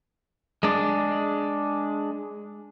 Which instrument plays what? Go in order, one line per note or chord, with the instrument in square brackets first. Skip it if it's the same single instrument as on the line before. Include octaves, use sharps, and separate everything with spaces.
[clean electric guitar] G#3 D4